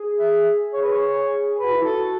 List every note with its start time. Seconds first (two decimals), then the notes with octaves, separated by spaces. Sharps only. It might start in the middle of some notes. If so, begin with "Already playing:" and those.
Already playing: G#4
0.18 E5
0.73 C#5
0.82 B4
0.92 C#5
1.56 G#4 B4
1.64 F#4
1.72 E4
1.82 F#4 A4